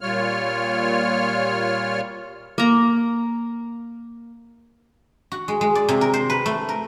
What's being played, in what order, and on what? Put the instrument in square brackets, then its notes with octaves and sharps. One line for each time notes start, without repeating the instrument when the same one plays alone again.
[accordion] A#2 G3 F4 C#5 F6
[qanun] A#3 A#5
[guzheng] F#4
G#3
G#3
D5
C3
A#4
C5
B4
A3
A#4